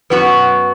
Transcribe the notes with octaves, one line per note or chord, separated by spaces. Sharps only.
F#2 F#3 B3 F#4 B4